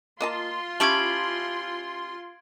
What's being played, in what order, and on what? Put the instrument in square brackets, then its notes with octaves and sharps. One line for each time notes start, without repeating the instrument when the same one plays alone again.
[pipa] A#3 D#5 A5 [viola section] F4 C6
[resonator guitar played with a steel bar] C#4 G4 A5 [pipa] E4 [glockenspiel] G#6 D7 F#7